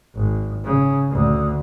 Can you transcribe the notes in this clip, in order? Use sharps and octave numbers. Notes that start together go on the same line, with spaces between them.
G#1
C#3
D2